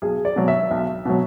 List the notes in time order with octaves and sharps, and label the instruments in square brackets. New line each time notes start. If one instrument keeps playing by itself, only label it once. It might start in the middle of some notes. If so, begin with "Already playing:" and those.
[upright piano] B1 G#4
D5
B2 F#3
E5
B1
B2 F#3